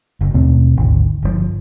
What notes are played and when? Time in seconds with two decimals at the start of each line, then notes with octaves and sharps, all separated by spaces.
0.21 F#1
0.34 D#2 B2 A3 C4
0.77 G#1 D2
1.22 G1 B2 F3